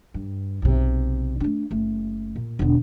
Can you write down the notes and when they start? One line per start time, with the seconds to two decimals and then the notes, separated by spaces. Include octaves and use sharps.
0.14 G2
0.62 B1 C3
1.40 A3 D4
1.71 F#1 A3
2.36 A#2
2.59 E1 D3